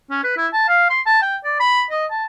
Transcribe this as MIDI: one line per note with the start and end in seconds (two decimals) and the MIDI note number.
0.10 0.19 61
0.24 0.36 71
0.37 0.47 64
0.53 0.66 81
0.69 0.89 77
0.90 1.01 84
1.06 1.20 81
1.22 1.36 79
1.44 1.57 74
1.60 1.84 83
1.91 2.05 75
2.11 2.25 81